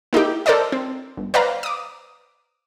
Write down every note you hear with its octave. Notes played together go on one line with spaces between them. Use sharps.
A#3 D#4 E4 G4
A4 A#4 C5 D5 D#5
C4
G1
B4 C5 D5 F5 A#5
D6 D#6